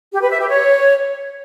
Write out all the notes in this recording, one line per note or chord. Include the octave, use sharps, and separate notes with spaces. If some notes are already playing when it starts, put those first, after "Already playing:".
G4
B4
E5
G4
C#5